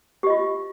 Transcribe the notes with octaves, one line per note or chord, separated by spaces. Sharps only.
F4 G4 D#5